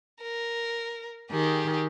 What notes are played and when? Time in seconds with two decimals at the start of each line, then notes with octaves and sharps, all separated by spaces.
0.22 A#4
1.31 D#3 G4 G#4